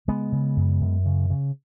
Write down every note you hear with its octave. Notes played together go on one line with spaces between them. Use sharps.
C#3 G#3 B3
C#3
F#2
F#2
C#3
C#3